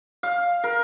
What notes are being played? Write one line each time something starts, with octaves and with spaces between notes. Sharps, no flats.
F5
A#4